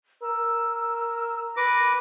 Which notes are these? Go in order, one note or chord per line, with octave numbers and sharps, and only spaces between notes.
A#4 E6
B4 D6 A#6